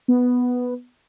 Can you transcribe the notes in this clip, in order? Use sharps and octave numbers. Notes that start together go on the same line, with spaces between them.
B3